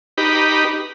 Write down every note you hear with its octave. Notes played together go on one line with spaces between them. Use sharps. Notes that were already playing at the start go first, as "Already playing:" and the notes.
D#4 G4 B4